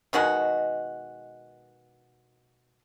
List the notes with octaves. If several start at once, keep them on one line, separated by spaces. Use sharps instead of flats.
B2 D#3 G#3 F#4